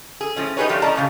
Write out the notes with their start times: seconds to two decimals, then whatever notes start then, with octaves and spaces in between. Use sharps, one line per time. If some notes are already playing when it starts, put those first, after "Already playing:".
0.21 G#4
0.36 A2 F3 C#4
0.57 D#4 G4 G#4 B4 C#5
0.69 F3 G3 A3 A#3 D4 G4
0.82 A2 C#4 D5 D#5 A5 A#5
0.96 A#2 C#3 F#3 G3